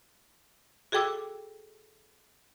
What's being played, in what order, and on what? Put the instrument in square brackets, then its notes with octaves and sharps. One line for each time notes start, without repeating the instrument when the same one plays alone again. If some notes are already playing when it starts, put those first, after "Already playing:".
[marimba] F#4 G#4 A4 G5 D6 E6